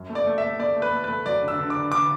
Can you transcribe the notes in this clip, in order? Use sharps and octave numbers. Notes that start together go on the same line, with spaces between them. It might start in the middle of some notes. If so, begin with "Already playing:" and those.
Already playing: F#2
A3
D5
A3
E5
A3
A3 D5
A3
B4
A3
B4
A3
F#3 D5
D3
E6
D3
D6
D3
D3 D6